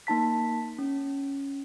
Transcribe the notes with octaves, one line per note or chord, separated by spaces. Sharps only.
A#3 D#4 A5 B6
C#4